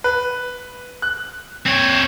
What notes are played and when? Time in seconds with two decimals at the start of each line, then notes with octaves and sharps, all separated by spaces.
0.04 B4
1.02 F#6
1.66 C4 C#5